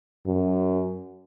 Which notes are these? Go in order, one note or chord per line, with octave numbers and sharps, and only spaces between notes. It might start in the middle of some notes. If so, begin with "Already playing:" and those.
F#2